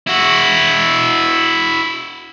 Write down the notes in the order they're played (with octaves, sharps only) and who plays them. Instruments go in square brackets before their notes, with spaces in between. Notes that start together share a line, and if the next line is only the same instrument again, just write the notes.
[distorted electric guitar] E4 F#4